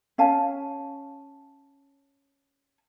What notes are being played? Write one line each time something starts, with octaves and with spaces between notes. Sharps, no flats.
C#4 F5 G#5 A5